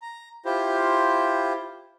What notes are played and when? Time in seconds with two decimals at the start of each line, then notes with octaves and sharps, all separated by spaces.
0.02 A#5
0.45 E4 F4 G4 C5